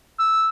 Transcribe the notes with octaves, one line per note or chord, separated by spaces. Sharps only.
E6